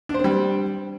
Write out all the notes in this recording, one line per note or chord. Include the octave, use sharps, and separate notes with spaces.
G3 C4 D4 C5